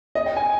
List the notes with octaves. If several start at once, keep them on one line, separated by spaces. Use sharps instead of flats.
D#5
G5
G#5